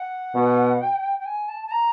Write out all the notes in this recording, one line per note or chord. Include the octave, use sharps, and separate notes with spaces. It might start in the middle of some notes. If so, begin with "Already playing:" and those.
Already playing: F#5
B2
G5
G5
G#5
A5
A5
A#5